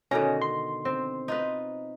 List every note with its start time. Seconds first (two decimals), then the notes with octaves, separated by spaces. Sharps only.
0.11 B2 D3 D#3 C#4 A#5
0.42 C6
0.85 C4
1.28 D#4 F4 B4